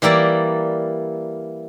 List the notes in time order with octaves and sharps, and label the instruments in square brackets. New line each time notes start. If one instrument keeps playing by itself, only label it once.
[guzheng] E3 G3 A#3 E4 D5